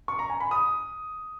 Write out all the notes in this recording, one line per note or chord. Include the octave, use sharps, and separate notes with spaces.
C#6
A#5
G#5
B5
D#6